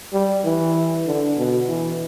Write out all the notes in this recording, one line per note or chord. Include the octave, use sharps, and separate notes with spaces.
G3
E3
D3
B2
E3